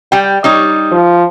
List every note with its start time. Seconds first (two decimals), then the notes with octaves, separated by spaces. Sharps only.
0.12 G3 G5
0.44 G3 D#4 C#5
0.91 F3